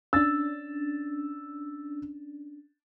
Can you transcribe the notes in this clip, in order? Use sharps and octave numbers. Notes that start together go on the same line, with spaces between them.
C#4 D4 E6 A6